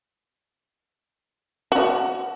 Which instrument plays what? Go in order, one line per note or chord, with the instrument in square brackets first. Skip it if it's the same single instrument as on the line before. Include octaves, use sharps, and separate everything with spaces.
[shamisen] F#4